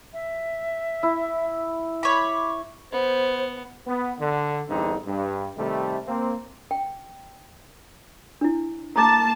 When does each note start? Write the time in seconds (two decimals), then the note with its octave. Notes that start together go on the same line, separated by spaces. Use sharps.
0.13 E5
1.03 E4
2.03 C#5 B5 D6
2.92 B3 C5
3.86 B3
4.20 D3
4.69 E2 G2 D3 C4 D#4
5.06 G2
5.57 C3 D#3 G3 A3
6.07 A#3 C4
6.71 G5
8.41 D4 E4
8.96 A#3 A5 A#5 D6